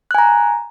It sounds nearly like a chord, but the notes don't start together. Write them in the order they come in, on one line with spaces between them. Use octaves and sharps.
F#6 G#5 A#5